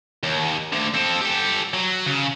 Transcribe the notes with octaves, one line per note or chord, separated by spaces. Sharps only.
D#2
D2 D3
C4 A4
G4 A4
F#3
C#3